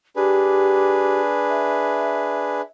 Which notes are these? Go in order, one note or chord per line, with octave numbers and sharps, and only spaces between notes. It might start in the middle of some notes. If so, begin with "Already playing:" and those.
D4 G4 G#4 B4
E5